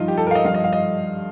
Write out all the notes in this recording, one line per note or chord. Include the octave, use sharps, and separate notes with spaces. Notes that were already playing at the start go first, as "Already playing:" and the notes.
Already playing: G2 F3 D#4 F4
G4
A4
A#4
F5
D#5
G2 F3 F5
D#5
F5
D#5